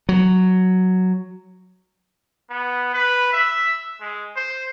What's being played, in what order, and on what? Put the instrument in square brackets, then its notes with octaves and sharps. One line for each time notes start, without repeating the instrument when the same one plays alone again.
[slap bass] F#3
[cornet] B3
B4
E5
G#3
C5